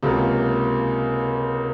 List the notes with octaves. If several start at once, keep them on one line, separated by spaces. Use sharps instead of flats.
C#2 C3 F#3 A#3 F4